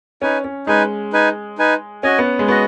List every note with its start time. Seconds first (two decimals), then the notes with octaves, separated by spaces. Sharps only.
0.22 C#4 D#4 B4 G#5
0.44 C#4
0.67 G#3 D#4 B4 G#5
1.13 D#4 B4 G#5
1.58 D#4 B4 G#5
2.03 C#4 F#4 D#5 G#5
2.19 B3
2.39 G#3
2.48 B3 F#4 D#5